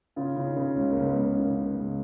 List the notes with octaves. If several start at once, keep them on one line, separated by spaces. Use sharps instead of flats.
C#3 F4
C#3
D#4
C#3
C#2 C#4
A#3
C#2
B3
C#2 B3
C#3 A#3
C#3
B3
C#2